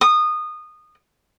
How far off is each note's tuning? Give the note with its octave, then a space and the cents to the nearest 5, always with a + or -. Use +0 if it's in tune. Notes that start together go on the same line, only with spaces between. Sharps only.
D#6 -20